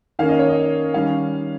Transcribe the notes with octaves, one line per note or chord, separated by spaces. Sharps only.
D#3 A#3 C#4 F5
D#5
C#5
D#5
D#3 G3 C#4 F5